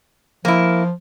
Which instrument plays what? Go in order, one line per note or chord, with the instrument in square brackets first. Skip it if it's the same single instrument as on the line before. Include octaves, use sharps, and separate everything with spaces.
[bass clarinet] F3 [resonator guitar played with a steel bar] A#3 E4